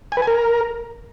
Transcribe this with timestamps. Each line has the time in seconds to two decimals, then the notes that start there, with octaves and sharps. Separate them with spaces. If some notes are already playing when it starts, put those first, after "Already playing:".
0.12 G#5
0.17 B4
0.22 G#5
0.27 A#4